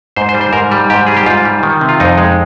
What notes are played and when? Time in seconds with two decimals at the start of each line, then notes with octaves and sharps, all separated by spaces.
0.17 G#2 C5
0.29 C5
0.35 G3
0.41 C5
0.53 G#2 A#4
0.71 G3
0.90 G#2 G4
1.07 G3 G#4
1.17 G4
1.26 G#2 F4
1.45 G3
1.63 D#3
1.81 C3
1.89 F4
2.00 F2 D#4
2.18 G#3